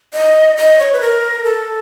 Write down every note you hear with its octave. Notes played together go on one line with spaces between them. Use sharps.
D#5
D#5
C#5
B4
A#4
A4